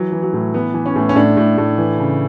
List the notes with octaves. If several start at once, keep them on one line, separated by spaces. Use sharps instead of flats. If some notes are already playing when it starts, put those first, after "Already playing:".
Already playing: E3 F#3
E3
F#3
A2
E3 B3
E3
C#4
A2
C#4
A2 D4
A2
A2
E3
C#3